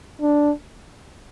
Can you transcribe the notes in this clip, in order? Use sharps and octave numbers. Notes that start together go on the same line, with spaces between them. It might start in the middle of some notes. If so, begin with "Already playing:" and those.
D4